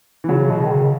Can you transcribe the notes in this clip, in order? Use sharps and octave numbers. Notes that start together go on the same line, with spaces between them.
E3
C#3 F#3
C#3
B2
D#3
C#3